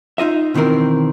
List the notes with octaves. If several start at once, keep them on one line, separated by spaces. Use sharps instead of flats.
D#4 F4 D#5 E5
B2 D#3 E3 C4 A#4